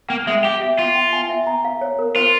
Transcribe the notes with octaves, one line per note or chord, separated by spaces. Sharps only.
A#3 G5
G#3 E5
G4 G5
E5
F4 C#6
G5
G#5
E5
A#5
F5
C#5
A#4
F4 C5